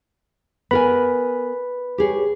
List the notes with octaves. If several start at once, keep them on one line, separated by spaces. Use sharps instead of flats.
B3 A#4 B4 G#5 B5
G4 G#4 C#5